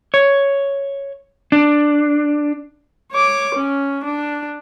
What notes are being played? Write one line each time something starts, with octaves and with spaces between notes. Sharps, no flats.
C#5
D4
C#5 D6
C#4
D4